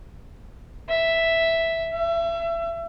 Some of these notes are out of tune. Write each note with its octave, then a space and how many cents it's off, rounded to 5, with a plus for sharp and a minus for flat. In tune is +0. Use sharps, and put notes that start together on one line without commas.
E5 +0
E5 +30